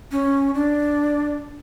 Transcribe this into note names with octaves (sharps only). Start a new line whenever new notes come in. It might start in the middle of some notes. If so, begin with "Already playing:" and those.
C#4
D4